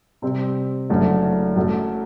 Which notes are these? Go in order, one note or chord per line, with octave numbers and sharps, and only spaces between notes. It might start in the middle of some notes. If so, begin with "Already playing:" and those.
C3 G3 C4
F#1 F#2 D3 A3 D4
F#2 F#3 A3